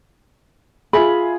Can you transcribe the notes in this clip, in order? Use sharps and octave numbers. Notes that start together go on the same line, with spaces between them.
F4 G#4 E5 B5